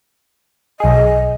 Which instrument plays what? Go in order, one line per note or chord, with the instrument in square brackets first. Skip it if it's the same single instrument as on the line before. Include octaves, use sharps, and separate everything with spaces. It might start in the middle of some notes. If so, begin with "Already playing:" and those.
[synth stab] B1 G#4 [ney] D#5